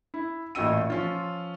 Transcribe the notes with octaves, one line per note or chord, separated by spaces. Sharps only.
E4
A1 A#2 F#4 D#5 E6 D#7
F3 C#4 F4